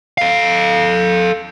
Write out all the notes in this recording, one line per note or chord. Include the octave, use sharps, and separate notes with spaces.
A4 F5